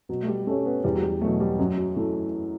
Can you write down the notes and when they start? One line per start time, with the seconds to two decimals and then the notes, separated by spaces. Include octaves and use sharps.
0.09 B2 F#3
0.23 A3
0.28 G3
0.47 A3 C#4 G4 C#5
0.65 B3
0.84 E2 G3
0.95 F#3
1.02 G3
1.21 B2 F#3 A3
1.40 G3
1.59 F#2 F#3
1.78 F#3
1.96 E3 A3